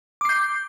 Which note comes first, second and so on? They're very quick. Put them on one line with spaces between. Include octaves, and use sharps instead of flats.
D6 C7 G6